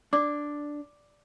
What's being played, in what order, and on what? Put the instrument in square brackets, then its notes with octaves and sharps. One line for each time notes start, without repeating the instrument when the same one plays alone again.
[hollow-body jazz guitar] D4 [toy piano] D5 D6